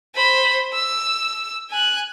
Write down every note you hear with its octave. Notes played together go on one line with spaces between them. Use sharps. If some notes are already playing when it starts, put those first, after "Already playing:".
C5 B5
E6
G#5 F#6